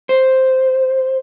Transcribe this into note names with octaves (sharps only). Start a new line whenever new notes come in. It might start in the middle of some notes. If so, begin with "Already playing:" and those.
C5